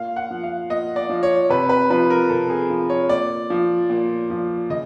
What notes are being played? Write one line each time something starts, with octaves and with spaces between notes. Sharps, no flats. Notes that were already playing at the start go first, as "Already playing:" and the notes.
Already playing: A#2 F5
F#5
F3
F5
A#2 D#5
D5
F3
C#5
C3 B4
B4
F3 B4
A#4
C3 A4
G#4
F3
C#5
A#2 D5
F3
A#2
F3
C#3 D#5